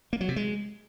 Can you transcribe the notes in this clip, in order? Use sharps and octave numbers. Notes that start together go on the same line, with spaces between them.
A#3
F#3
C3
G#3